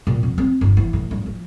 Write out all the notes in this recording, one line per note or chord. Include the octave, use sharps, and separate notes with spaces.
A#2
F2
C4
G1
E3
A2
G2
F3